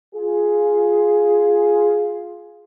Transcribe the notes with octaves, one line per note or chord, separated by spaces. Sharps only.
F4 G#4